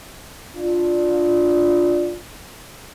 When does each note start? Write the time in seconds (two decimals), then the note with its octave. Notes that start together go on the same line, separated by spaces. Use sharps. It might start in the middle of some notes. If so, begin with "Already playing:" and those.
0.55 D4 F4